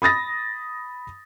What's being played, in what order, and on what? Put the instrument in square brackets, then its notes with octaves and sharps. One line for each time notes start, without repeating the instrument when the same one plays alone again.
[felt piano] B5 D#6 A6 A#6